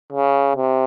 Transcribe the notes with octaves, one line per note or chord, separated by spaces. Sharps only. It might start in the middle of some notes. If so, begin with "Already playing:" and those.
C#3
C3